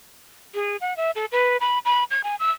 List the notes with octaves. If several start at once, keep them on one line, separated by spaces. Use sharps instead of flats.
G#4
F#5
E5
A4
B4
B5
B5
G#6
G#5
E6